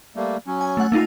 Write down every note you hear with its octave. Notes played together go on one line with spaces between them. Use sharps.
G3 A3 A#3
F#3 C#4
G#5
A3 F#5
A3 A#3 D#4 F4